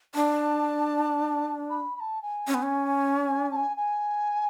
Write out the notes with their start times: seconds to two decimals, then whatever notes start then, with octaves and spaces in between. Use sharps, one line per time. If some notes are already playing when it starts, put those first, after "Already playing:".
0.14 D4 A5
1.70 B5
1.95 B5
2.00 A5
2.22 G#5
2.47 C#4
2.54 B3
2.63 C#4
3.25 G#5
3.51 A5
3.55 G#5
3.77 G#5